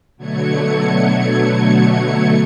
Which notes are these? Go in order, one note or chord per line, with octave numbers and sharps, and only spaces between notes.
B2 D3 F#3 A3 G#6 C#7